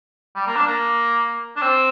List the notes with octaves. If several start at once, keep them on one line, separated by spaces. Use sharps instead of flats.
G3
A#3
D4
A#3
D4
C4